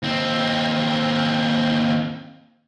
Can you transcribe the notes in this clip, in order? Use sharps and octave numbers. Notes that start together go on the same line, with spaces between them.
D#2 C4